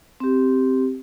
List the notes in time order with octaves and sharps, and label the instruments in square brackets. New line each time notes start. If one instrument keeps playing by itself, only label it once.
[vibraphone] C4 G4